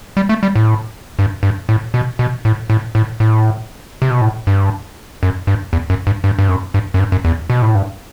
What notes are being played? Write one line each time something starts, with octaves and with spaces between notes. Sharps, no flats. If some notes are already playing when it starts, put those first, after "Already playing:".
G3
A3
G3
A2
G2
G2
A2
B2
B2
A2
A2
A2
A2
C3
B2
A2
G2
F#2
G2
E2
F#2
G2
G2
G2
F#2
G2
F#2
G2
F#2
E2
B2
A2
G2